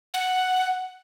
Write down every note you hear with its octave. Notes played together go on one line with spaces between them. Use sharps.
F#5